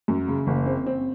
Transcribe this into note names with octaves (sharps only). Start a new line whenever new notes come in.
F#2
C#3
F#1
C4
C4